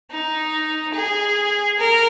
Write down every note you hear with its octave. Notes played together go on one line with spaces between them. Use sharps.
D#4
G#4
A#4